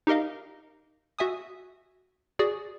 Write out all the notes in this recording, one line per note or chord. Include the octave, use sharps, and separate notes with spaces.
D#4 G4 A#4 D#5 F5
F#4 E5 G#5 D#6
F#4 G#4 D5